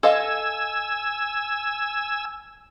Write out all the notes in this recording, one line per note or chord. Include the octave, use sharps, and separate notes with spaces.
A4 D#5 F5 G#5 E6